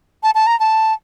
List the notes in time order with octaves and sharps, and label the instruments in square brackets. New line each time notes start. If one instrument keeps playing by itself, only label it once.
[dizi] A5
A5
A#5
A5